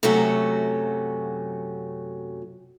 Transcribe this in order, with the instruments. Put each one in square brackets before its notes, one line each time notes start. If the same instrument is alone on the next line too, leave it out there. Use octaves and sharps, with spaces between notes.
[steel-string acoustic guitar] F#2 C3 F#3 A3 C#4 F#4